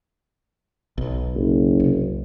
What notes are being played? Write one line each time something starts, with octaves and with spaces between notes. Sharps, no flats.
B1
F#1
C2